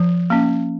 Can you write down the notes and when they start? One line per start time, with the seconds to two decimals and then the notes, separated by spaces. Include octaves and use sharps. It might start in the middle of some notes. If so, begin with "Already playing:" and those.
Already playing: F3
0.30 A#3 C#4